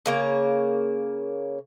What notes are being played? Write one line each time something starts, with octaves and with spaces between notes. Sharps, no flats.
C#3 A#3 C#5